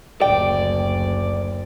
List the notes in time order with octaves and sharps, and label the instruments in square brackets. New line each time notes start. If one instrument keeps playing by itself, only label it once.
[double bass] F#1 D2 [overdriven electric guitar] D5 [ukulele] G5